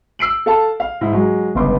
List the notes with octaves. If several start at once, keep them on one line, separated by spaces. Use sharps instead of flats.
E6 C7 D7 F#7
A4 F5 A5
F5
G#2 E4
F#3 G#3
G1 C#2 B3 C6 D6